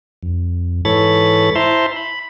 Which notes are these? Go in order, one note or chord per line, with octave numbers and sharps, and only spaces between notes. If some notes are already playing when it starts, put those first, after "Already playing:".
F2
G#2 E3 A4 C#5 B5 A6
E4 C5 E5 A5 A#5 C6
B5